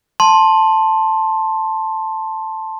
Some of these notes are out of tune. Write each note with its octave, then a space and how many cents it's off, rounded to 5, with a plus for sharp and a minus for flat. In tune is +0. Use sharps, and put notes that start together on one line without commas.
A5 +0 C6 +15